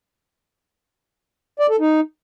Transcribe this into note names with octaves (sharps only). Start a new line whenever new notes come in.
D5
A4
D#4